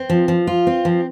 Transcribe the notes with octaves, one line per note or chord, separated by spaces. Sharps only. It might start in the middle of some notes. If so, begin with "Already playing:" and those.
Already playing: C4
F3
F3
F4
C4
F3